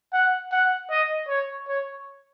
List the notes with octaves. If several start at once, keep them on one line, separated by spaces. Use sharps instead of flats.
F#5
F#5
D#5
C#5
C#5